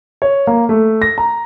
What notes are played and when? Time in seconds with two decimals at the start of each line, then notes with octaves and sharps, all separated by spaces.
0.22 C#5
0.47 A#3
0.69 A3
1.02 A#6
1.18 A#5